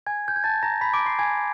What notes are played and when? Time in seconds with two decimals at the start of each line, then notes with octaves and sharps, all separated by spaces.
0.06 G#5 G#6
0.28 G6
0.36 G#6
0.44 A5 A6
0.63 A#5 A#6
0.81 B5 B6
0.93 D6 D7
1.06 C6 C7
1.19 G#5 G#6